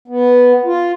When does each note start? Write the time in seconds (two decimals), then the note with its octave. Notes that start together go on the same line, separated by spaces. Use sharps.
0.08 B3
0.65 F4